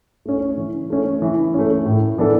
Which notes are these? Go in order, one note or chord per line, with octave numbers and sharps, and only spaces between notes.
A3 C#4
E3
A3 C#4
E3
A3 C#4
A2
E3 B3 D4 A4